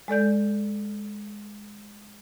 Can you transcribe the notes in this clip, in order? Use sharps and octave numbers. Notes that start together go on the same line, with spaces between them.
G#3 A4 D5 G6